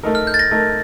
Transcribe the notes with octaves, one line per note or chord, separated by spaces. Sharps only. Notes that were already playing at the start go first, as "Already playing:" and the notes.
A3 D#4 A#4
F6
G6
A6
A#6
A3 D#4 A#4